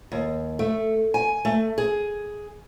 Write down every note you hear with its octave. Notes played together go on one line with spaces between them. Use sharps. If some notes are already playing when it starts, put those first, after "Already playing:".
D#2
A3
G#5
A3
G#4